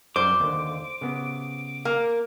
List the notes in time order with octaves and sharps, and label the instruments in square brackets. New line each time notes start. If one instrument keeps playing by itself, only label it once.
[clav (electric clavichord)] F#2 G3 [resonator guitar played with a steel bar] C5 [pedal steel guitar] D6
[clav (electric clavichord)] D#2 D3
C#3 B3
[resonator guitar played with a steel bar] A#3